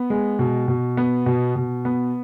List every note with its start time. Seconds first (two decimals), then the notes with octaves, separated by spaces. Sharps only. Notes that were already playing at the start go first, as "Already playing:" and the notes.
Already playing: B3
0.10 G#3
0.39 B2
0.68 B2
0.97 B3
1.26 B2
1.56 B2
1.85 B3